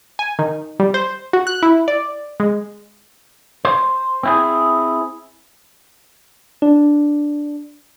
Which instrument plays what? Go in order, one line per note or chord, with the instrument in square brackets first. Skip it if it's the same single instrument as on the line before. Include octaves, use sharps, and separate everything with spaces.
[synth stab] G#5
D#3
G3
C5
F#4
F#6
E4
D5
G#3
[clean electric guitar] C5
C4 E4 G#4
[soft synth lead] D4